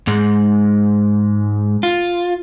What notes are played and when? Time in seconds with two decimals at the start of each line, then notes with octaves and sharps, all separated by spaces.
0.07 G#2 G#3
1.83 F4